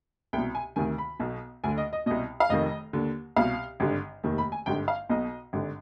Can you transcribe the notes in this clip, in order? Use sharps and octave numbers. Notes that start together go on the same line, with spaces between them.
C2 B2 G5
G#5
D2 C3 D#3 G#5
B5
B1 B2
D2 D3 G#5
D#5
D#5
C2 B2 D#5
F5
F1 F2 D#3 D#5
D#2 D3
C2 B2 F5
G#1 G2 D3
F1 D#2 D#3
B5
G#5
G#1 G2 D3 G5
F5
B1 B2 D#5
G#1 G2 D3